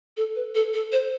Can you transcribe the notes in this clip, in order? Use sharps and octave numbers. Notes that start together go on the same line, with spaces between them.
A4
B4
A4
A4
C5